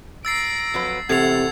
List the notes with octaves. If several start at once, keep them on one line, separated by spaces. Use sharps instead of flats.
A#5 E6 A6 C7 D7
F2 F#3 B4
E2 A2 C3 A4 F#5 G#6 C7 F7